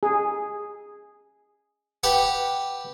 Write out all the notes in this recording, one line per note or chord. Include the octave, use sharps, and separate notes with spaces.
G#4
G4 B4 F#5